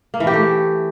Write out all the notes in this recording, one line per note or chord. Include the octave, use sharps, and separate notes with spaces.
A#3
E3
G4
A3